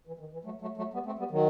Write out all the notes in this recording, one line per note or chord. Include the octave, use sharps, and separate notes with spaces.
E3
D#3
E3
F#3 A3
F#3 A3
F#3 A3
G3 B3
A3 C4
G3 B3
D#3 F#3